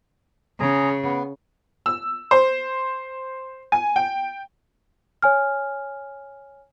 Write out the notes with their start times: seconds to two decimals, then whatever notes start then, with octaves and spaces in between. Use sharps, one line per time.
0.60 C#3 G#4 A#5
1.04 B3
1.86 E6
2.31 C5
3.72 G#5
3.96 G5
5.22 C#5 G#5 F6